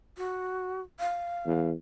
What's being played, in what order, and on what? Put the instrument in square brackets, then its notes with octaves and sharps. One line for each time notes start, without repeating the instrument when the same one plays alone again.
[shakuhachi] F#4
F5
[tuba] E2